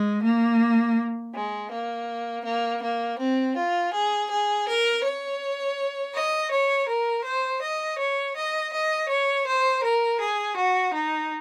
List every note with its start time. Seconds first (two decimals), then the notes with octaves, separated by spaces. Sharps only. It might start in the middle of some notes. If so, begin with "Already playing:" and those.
Already playing: G#3
0.23 A#3
1.34 G#3
1.71 A#3
2.44 A#3
2.81 A#3
3.18 C4
3.55 F4
3.92 G#4
4.29 G#4
4.66 A#4
5.03 C#5
6.14 D#5
6.51 C#5
6.88 A#4
7.24 C5
7.61 D#5
7.98 C#5
8.35 D#5
8.72 D#5
9.09 C#5
9.46 C5
9.82 A#4
10.20 G#4
10.56 F#4
10.93 D#4